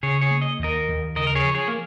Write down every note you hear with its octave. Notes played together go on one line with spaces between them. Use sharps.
C#3 G#4 C#5
G#4 C#5
A#3
D#5
D#2 A#4 D#5
D#2
C#3 A#4 D#5
A#4
G#4 C#5
F3
G#4 C#5
A#3